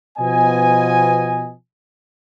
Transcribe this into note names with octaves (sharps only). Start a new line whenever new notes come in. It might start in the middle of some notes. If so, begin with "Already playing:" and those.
B2 F3 B3 D#5 G#5